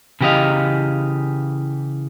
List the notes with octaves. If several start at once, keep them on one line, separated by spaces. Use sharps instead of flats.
C#3 E3 G4 B4 D#5 F5